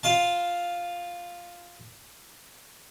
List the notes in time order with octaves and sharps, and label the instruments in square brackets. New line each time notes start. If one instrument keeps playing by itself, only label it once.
[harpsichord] F4 F5 A5